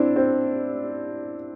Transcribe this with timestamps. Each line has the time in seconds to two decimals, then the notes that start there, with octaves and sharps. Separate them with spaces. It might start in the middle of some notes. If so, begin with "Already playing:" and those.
Already playing: C4 D4 E4
0.16 C4